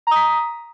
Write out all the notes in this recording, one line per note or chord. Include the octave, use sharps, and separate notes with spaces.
A#5 D#6 B6